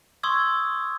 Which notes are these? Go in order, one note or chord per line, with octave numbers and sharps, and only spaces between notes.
C6 C#6 D#6 E6 G#6